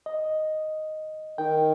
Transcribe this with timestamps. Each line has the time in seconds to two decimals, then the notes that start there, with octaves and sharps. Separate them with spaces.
0.06 D#5
1.38 D#3 G5